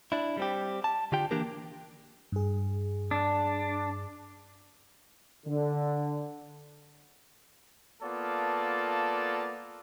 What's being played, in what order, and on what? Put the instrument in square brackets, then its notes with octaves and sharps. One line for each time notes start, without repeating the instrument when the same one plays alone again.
[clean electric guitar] D4 E4
G3 C4 G4
A5
D3 F4 G4 G5
E3 A#3 D4 G4 A#4
[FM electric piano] G2 G#4
[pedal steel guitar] D4
[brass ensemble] D3
[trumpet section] A#3 B3 F4 A4 D5 A5